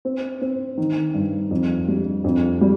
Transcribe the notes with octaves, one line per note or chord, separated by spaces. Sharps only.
C4
C4
D#3
G2
F2
G3
F2
G3